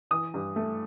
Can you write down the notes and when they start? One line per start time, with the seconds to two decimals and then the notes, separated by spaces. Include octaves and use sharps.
0.11 E3 D#6
0.34 G2
0.56 A3